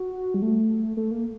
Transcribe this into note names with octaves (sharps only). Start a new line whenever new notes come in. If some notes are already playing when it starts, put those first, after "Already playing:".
Already playing: F#4
G3
A3
A3
A#3